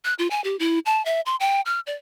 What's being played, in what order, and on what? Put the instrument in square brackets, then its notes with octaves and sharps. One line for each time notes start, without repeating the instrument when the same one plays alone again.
[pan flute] F#6
F4
G#5
G4
E4
A5
E5
C6
G5
F6
D5